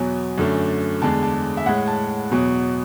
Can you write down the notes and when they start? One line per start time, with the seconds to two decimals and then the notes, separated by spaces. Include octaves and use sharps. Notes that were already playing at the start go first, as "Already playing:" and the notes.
Already playing: E2 B2 F#3 G#5
0.38 F#2 D3 A3
1.02 E2 D3 G#3 A5
1.23 A5
1.57 E5
1.66 A2 G#3 F#5
1.88 A5
2.31 E2 B2 F#3